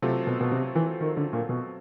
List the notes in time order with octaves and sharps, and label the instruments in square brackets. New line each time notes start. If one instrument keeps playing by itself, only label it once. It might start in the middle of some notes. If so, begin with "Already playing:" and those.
[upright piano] C3 [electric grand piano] F#3 A3 C4 F4 A4
[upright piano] B2
B2
C3
E3
D#3
D3
A#2
B2